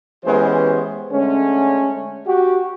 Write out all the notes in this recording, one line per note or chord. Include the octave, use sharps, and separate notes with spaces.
E3 G#3 B3 C#4 G4 C5
D3 G#3 A3 C#4
F#4 G4